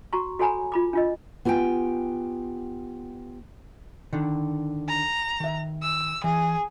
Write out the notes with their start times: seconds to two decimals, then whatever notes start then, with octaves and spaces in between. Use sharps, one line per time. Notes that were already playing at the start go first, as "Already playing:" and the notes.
0.13 F#4 A#5 C#6
0.39 F#4 A4 C#5 G#5 A#5 B5
0.72 F4 B5 D6
0.93 D4 F4 D#5
1.45 B3 F4 G4 F5 G5 G#5
4.13 D3 D#3
4.88 A#5
5.40 D#3 E5
5.82 E6
6.24 E3 G#4